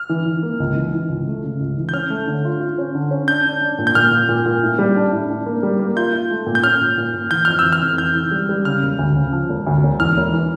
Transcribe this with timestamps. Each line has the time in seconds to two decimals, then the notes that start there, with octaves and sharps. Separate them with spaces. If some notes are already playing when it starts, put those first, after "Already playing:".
Already playing: F6
0.09 E3
0.26 E3
0.43 A#3
0.60 C#2
0.76 E3
0.93 E3
1.09 C#2
1.27 A3
1.43 C#3
1.60 C#2
1.78 E3
1.89 G6
1.93 C#4 F6
2.10 A3
2.27 D3
2.45 F4
2.60 F4
2.78 C#4
2.95 D3
3.11 C#4
3.28 D4 G6
3.44 D4
3.61 D4
3.78 A#2
3.87 G6
3.95 A#2 F6
4.11 A#2
4.29 A#2
4.46 A#2
4.63 A2
4.79 G3
4.96 D4
5.12 A2
5.30 D4
5.46 A#3
5.63 G3
5.79 A#3
5.96 F4 G6
6.13 F4
6.31 A3
6.46 A#2
6.55 G6
6.63 C#4 F6
6.81 A#2
6.98 A#2
7.14 A#2
7.31 E3 G6
7.45 F2 F6
7.59 E6
7.64 E3
7.73 F6
7.82 F1
7.98 E3 G6
8.15 E3
8.31 G3
8.49 G3
8.65 C#3 F6
8.82 E1
8.99 D2
9.16 C#3
9.32 F3
9.49 E1
9.67 D2
9.83 E1
10.00 E2 F6
10.17 E1
10.33 E3